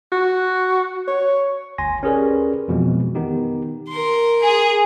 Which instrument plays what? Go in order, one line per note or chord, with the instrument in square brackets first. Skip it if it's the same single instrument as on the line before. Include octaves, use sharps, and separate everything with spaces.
[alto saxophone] F#4
C#5
[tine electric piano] G1 D2 G#5 C6 A#6
C#4 G4 G#4 A#4 B4 D5
F2 B2 E3 F3 G#3
D#3 B3 D#4 G4
[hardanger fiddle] A#4 C6
[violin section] G#4